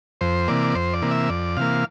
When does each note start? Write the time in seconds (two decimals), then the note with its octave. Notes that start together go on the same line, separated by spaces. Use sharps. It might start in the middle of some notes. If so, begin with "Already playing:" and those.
0.21 F2 C5
0.48 C3 E3 A#3 D5
0.75 F2 C5
0.93 D5
1.02 C3 E3 A#3
1.11 E5
1.30 F2 D5
1.57 C3 E3 A#3 F5